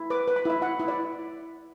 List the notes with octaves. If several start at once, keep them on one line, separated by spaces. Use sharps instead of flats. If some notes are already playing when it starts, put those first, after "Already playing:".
Already playing: E4
B4 D6
B4
B5
E4 E5
E4 F#5
E4
D5